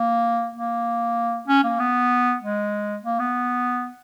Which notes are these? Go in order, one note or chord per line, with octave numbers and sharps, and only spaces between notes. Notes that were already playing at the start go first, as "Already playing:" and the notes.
Already playing: A#3
A#3
C#4
A#3
B3
G#3
A#3
B3